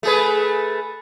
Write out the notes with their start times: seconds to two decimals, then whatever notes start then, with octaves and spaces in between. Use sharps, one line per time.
0.03 A3 G#4 B4